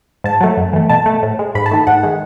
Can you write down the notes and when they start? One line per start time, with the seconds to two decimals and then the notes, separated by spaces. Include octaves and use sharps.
0.24 G#2 A5
0.41 F#3 A3
0.57 F#2
0.73 E3 A3
0.89 B2 A5
1.06 A3
1.23 A2
1.39 G#3
1.55 G#2 B5
1.66 A5
1.71 D#3 A3
1.87 G#2 F#5
2.03 D#3 G#3